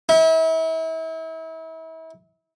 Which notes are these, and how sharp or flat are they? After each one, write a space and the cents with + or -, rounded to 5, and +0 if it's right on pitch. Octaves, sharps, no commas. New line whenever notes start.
E4 -35